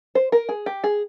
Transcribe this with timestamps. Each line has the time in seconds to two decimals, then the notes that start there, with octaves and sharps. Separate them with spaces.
0.15 C5
0.32 A#4
0.49 G#4
0.66 G4
0.84 G#4